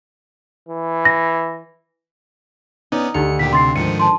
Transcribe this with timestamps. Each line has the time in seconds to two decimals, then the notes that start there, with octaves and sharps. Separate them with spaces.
0.69 E3
1.05 A#6
2.92 B3 C#4 D#4 D5
3.14 D2 D#4 G4 C#7 F7
3.39 A#2 D#3 G4 B6
3.53 C3 C6 A6 C7
3.76 G#2 D#3 F3 C#7 D#7
3.99 A5 C6